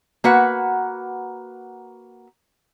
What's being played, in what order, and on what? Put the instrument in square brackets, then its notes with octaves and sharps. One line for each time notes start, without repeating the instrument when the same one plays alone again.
[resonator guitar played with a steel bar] A#3 F#4 B4 F#5